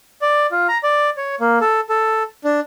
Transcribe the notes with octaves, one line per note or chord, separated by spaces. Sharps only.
D5
F4
A#5
D5
C#5
A#3
A4
A4
D4